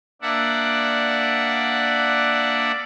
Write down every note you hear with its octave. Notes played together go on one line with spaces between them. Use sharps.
A#3 D4 D5 E5 F#5